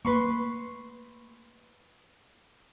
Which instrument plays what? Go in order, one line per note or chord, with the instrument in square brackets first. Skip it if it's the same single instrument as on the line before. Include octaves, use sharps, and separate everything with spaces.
[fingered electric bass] A3 A#3 [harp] B4 C6 C#6